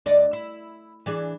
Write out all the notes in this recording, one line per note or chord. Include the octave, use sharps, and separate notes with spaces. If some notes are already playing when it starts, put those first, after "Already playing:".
D2 D5 D#5
E4
E3 D4 G#4